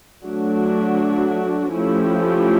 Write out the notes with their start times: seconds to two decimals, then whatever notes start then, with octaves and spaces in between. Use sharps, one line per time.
0.24 F#3 A3 D4 F#4
1.73 F3 A3 C#4 E4 G4